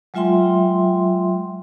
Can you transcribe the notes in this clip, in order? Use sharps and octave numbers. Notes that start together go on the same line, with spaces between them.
F#3 G#3 F4 E5 G5 C6